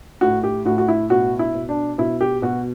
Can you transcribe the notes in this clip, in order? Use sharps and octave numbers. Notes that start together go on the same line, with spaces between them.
A2 F#4
G4
A2 F#4
F#4
E4
B2 F#4
E4
B2
D4
B2 E4
G4
B2 F#4